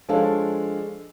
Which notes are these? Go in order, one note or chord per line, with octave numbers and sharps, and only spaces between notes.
F3 G#3 D4 A4 C#5 F5